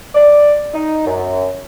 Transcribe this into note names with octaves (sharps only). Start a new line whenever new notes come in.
D5
D#4
F#2